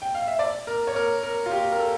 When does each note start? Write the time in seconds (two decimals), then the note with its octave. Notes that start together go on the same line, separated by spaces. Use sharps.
0.02 G5
0.15 F5
0.27 E5
0.39 D5
0.67 A#4
0.87 C#5
0.96 A#4
1.23 A#4
1.46 F4
1.52 G4
1.72 A#4
1.80 A4